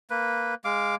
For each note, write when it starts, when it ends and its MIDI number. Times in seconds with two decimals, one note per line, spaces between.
0.10 0.54 58
0.10 0.54 71
0.65 0.95 56
0.65 0.95 77
0.65 0.95 86